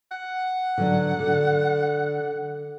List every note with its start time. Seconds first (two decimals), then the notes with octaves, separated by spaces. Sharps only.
0.11 F#5
0.78 D3 F#3 D4
1.20 D3